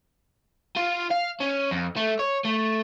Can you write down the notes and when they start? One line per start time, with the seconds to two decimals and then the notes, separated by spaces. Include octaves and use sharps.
0.76 F4
1.10 F5
1.40 C#4
1.71 F2
1.96 A3
2.19 C#5
2.45 A3